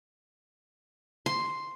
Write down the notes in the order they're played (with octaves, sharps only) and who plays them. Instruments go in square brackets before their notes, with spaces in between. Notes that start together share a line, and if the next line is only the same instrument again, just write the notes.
[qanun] C6